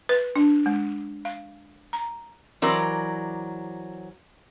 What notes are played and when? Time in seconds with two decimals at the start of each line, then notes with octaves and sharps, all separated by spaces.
0.09 B4
0.36 D4
0.66 G#3
1.25 F5
1.93 A#5
2.62 E3 F#3 C4 A#4 D5